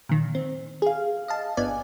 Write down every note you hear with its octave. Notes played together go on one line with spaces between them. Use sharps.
A#2 D#3
C4
G#4 F5
D#5 F5 A5
G1 B3 D5 G#5